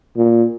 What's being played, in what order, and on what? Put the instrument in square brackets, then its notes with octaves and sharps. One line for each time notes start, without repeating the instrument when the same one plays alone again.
[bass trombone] A#2